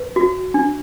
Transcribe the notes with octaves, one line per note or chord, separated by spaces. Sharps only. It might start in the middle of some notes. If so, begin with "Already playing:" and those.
Already playing: B4
F#4
D4